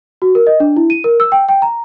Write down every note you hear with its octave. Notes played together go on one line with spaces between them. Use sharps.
F#4
A#4
D#5
D4
E4
D#7
A#4
E6
G5
G5
A#5